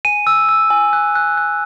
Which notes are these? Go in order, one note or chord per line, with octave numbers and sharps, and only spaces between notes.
G#5 D#7
E6
E6
G#5
F#6
F#6
F#6